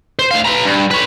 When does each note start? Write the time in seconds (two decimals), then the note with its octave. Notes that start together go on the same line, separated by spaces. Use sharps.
0.19 C5
0.31 D2 F5
0.46 B4 A#5
0.65 G2
0.91 B4 C#5